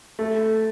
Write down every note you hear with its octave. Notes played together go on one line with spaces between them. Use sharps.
A3